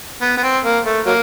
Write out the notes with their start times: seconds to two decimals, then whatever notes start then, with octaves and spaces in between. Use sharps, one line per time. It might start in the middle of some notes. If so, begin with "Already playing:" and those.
0.22 B3
0.37 B3
0.43 C4
0.64 A#3
0.85 A3
1.06 F#3 A#3